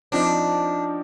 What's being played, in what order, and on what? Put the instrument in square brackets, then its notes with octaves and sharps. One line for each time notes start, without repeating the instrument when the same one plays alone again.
[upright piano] F3 C4 D#4 [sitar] D4